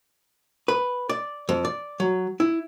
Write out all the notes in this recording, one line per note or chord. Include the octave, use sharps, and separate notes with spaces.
B4
D5
F2
D5
F#3
E4